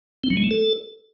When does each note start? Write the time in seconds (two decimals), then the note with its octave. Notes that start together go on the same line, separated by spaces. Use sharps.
0.24 C4
0.30 F#3
0.37 G#3
0.44 A3
0.51 A4